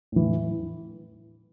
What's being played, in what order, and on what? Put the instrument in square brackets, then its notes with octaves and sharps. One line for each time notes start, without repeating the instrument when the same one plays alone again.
[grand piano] A2 E3